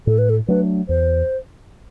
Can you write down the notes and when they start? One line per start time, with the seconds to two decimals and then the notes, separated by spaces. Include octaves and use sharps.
0.07 A2 A4
0.18 B4
0.30 A4
0.48 F#3 A3 D4 B4
0.89 E2 C5